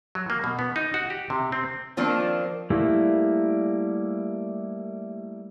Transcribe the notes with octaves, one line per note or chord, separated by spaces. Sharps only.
F#3
A#3
B2
B3
D#4
F#4
G4
C3
C4
D#3 F3 A#3 C4 D4
G3 A3 A#3 E4